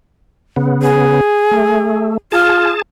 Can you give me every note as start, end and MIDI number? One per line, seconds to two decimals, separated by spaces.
0.56 1.21 49
0.56 1.21 59
0.82 2.08 68
1.51 2.17 57
2.32 2.69 65
2.32 2.82 68
2.32 2.82 81